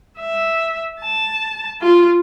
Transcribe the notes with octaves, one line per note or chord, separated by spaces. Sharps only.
E5
A5
F4